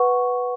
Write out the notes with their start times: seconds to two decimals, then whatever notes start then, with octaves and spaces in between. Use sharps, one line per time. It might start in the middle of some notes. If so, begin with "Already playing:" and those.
Already playing: B4 F#5 C#6